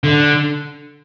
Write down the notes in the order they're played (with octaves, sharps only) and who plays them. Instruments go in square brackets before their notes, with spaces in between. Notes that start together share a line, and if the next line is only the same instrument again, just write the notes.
[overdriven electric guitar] D3